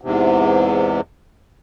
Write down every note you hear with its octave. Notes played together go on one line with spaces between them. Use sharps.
E2 G#2 C3